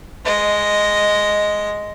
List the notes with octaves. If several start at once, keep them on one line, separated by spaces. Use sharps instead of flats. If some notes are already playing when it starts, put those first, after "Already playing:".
G#3 D#5